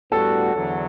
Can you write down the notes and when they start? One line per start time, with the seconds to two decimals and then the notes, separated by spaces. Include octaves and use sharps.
0.12 A2 G3 B3 D4 F#4 A4
0.54 E2 D3 F#3